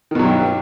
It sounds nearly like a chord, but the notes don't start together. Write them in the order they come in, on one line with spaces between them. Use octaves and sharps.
D#3 B2 F#3 G2